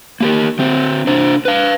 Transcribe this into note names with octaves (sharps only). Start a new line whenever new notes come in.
A#3 G4 A#4
D3 C4
C3 D4 C5
B4 F5